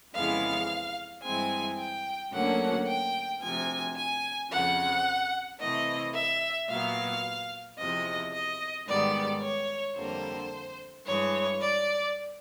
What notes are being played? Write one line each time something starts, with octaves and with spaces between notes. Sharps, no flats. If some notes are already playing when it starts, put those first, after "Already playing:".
F2 C#3 E3 G#3 B3 F5
G2 E3 G#3 C4 G#5
G5
D2 D3 F#3 A#3 C#4 F#5
G5
D2 C3 F3 G#5
G#5
F2 C#3 F3 F#5
C3 E3 A3 D#5
E5
A#2 F#3 B3 F5
E2 C3 F3 D#5
D#5
G#2 D#3 G3 B3 D5
C#5
F2 D3 G3 A#3 C5
G2 E3 G#3 C#5
D5